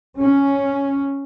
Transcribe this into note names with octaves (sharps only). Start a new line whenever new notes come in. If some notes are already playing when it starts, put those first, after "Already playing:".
C#4